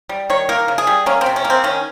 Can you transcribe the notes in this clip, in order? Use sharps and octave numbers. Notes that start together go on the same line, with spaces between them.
G3
D#3 C#5
A#3 A#4
C#3
G#4
G3
A#3 C#4
C4
C3
C#4
A#3
C4
D#3 C#4